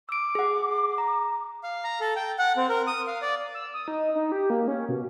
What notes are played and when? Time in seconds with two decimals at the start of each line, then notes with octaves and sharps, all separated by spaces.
0.09 D6 E6 D7
0.35 G#4 F#5
0.98 A#5
1.63 F5
1.84 A#5
2.00 A4
2.16 G5
2.39 F#5
2.57 C4
2.69 A#4
2.87 D#6
3.07 F5
3.22 D5
3.54 E6
3.74 D#6
3.88 D#4
4.15 D#4
4.32 G4
4.50 A#3
4.68 C#4
4.89 B2